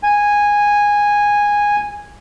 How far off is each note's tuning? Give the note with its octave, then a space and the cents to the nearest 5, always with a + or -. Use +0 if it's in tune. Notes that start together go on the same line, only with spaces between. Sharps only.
G#5 -10